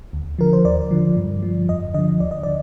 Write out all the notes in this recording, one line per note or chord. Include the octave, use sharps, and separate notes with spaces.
D2
D3 F3 A#4
C5
D#2 D5
D3 F3
G2
F3
F2 D#5
D3 F3 D#5
D2 D5
D#5
D3 D5